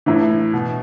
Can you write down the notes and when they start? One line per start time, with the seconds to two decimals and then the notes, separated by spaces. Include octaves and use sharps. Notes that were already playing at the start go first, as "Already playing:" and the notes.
0.06 A2 E3 E4
0.53 B2